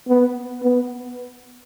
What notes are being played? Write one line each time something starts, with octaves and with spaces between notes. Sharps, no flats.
B3
B3